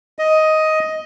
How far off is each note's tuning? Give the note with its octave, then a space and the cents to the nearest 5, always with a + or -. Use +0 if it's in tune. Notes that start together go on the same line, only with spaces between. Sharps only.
D#5 +10